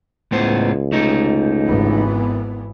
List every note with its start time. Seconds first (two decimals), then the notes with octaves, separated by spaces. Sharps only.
0.32 C#2 A2 B3 C5
0.92 A3 D#4
1.67 G#1 E3 B3